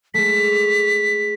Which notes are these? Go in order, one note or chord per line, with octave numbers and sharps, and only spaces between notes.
G#3 A3 B6